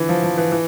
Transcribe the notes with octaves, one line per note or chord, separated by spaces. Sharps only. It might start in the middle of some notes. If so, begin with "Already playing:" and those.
Already playing: D3 E3
F3
F3
E3
E3